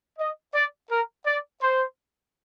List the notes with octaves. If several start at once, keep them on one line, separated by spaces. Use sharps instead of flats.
D#5
D5
A#4
D5
C5